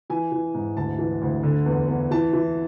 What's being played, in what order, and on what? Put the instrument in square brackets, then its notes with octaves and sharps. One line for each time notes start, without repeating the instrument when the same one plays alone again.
[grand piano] E3 G#5
E3
G#2
D2 A5
E3
D2
D3
E2
E2
E3 A5
E3